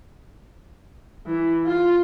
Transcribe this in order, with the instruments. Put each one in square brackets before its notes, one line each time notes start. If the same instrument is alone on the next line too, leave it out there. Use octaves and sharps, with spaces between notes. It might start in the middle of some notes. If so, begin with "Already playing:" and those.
[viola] E3
F4